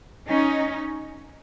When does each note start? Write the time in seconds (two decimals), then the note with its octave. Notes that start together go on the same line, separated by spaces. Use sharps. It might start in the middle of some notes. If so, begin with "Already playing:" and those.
0.26 C#4 D#4